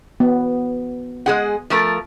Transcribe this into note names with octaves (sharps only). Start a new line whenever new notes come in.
B3
G#3 G#4 F#5
F3 A3 A#4